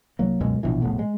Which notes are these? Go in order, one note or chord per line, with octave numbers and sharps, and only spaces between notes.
C2 F#3 A#3
C#2 F#2 B2 G#3
A#1 B2 E3
F1 A#1 A2 B3
G#3